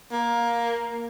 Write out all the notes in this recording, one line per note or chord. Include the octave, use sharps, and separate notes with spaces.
A#3